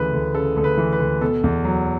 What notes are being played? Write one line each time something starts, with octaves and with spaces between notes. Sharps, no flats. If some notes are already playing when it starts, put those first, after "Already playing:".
Already playing: D2 C#3 E3 B4
D2
C#3 A4
D2 A4
B4
E3
B4
D2
B2 A4
E2
F#3